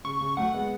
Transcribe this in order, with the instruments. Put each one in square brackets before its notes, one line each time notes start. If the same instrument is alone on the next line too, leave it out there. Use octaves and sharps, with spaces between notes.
[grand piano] C#3 [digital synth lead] C#6
[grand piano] C#3
[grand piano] F#3 A3 [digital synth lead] F#5
[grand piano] G#3 B3